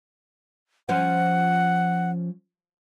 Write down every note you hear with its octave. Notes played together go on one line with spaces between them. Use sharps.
F3 C#4 C5 F#5